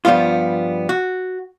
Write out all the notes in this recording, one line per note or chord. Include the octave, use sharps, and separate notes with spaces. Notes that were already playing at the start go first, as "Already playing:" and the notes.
G2 F3 G3 B3 F4
F#4